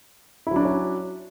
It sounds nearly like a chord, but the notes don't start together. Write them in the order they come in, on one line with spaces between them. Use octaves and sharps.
E4 F#3 D4 F#4 C#4